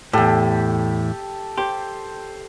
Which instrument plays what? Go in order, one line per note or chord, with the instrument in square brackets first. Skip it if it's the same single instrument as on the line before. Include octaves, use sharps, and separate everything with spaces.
[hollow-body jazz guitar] E2 A2 [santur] G4 A4
[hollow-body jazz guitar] G4 [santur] C5